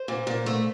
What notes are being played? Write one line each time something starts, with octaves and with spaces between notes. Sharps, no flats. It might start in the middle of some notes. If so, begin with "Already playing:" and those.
Already playing: C5
A#2
A#2
A3